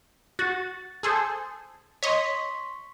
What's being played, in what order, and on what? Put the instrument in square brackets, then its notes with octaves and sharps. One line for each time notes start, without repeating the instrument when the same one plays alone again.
[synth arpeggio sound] F#4 [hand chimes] A6
[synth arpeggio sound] G#4 A4 C5
[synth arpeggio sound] C#5 D#5 [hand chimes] C6 C#6 B6